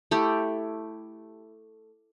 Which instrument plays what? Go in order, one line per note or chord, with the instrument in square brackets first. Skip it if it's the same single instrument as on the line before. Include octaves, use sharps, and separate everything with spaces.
[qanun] A3 E4 G4